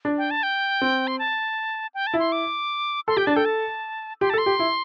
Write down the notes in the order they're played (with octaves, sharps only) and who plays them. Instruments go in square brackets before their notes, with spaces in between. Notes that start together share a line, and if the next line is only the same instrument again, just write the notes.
[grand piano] D4
[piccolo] G5
A5
G5
[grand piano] C4
[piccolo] C6
A5
G5
A5
[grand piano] E4
[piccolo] C6
D6
[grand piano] A4 [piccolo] C6
[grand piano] G4 [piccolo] G5
[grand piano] D4 [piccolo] A5
[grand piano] A4 [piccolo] G5
[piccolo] A5
[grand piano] G4 [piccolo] C6
[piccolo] A5
[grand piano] A4
[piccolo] C6
[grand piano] G4
E4